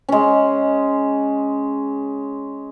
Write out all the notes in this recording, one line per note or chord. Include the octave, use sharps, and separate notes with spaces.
G#3 C#4